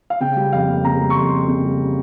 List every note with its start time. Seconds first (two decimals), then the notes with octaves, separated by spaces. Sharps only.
0.10 F5
0.20 C#3 G5
0.36 G3
0.53 F2 F5
0.69 A#3
0.85 C#3 A#5
1.00 G3
1.10 C#6
1.16 F2 C6
1.32 A#3
1.47 C#3
1.64 G3